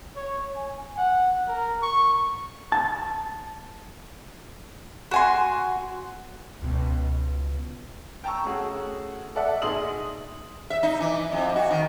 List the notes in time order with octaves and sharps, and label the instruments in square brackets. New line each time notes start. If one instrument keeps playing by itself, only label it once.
[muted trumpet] C#5
G#5
F#5
A#4
C#6
[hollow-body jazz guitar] A5
[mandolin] F#4 G#5 C6
[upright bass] C#2 B2
[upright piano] G5 A5 A#5 C#6 E6
A3 C#4 F#4 G#4
A4 D5 E5 F#5
A#1 D#4 G#4 C6 D#6 F#7
[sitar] E5
D#4
E3
F2
F#4
D#3